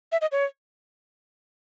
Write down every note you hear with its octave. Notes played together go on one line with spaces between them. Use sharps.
E5
D#5
C#5